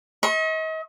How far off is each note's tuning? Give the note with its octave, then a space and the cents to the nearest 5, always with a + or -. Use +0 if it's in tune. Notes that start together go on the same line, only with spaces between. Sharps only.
D#5 +40 C#6 -40